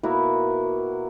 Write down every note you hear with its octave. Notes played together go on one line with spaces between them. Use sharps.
B2 A#3 E4 F#4